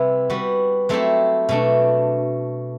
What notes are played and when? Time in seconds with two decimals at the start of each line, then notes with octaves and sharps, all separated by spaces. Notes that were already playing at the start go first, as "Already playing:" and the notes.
Already playing: C3 G3 B3 E4
0.30 G3 B3 F#4
0.89 F#3 A3 C4 E4 G4
1.49 B2 A3 D4